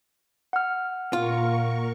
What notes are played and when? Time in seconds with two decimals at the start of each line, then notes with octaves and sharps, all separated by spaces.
0.53 F#5 F6
1.13 A#2 F4 A#4 C#6